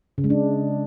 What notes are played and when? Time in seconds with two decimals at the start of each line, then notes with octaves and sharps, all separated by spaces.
0.18 C#3
0.24 G#3
0.30 D4